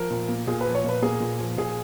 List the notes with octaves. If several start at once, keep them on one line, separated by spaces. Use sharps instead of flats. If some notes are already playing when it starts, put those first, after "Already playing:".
Already playing: F3 A#4
A#2
A#3
A#2 G#4
B4
F3
C#5
A#2 B4
A#3 G#4
A#2
F3
A#2 G#4